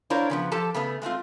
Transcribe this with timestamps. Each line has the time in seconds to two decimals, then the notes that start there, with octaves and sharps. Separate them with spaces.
0.10 D4 E4 F4 A#4 C5 C#5
0.30 C#3 F3 B3
0.52 F3 G4 A4 A5
0.74 C#3 A3 B3
1.02 G#3 A3 C4 F4